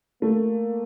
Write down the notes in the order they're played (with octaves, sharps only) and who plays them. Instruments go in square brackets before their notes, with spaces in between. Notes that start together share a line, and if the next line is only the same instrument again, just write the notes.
[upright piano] A3 [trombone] A#3